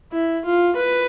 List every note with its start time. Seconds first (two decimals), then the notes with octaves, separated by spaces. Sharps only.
0.12 E4
0.45 F4
0.76 B4